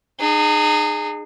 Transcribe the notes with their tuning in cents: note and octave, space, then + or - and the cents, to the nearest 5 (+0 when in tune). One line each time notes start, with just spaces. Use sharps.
D#4 -40 G#4 +0